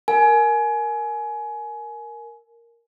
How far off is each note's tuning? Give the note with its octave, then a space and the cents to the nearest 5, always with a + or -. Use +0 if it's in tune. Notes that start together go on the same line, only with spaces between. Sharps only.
A#4 +0 G#5 +25